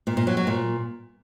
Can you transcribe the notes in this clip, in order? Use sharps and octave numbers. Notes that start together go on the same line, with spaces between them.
A#2
A#2
F#3
F#3
A#2